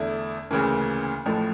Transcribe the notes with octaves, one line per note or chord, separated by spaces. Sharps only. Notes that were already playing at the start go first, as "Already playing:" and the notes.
Already playing: E2 D3 A3 E4
D2 C#3 E3 A#3 C#4
A1 A2 F3 A3